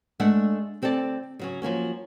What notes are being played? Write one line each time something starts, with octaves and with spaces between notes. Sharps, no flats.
G#3 A3 D4 E5 F#5
D2 C4 A4 D5 A5
C#3 F#3 C#4
F3 F#3 A#3 C#4